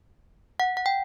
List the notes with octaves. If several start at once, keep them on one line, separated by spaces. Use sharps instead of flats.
F#5
F#5
G5